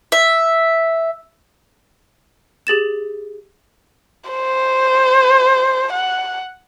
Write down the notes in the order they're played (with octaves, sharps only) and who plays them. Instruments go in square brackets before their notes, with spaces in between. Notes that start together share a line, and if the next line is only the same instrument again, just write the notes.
[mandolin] E5
[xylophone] G4 G#4 A6 E7
[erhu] C5
F#5